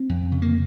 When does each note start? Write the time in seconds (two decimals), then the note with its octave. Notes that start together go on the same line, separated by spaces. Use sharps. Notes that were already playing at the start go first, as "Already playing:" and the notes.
Already playing: C4
0.09 F2
0.32 C#3
0.42 A#3